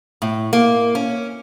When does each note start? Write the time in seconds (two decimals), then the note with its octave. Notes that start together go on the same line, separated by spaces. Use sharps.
0.22 A2
0.53 A#3
0.95 C#4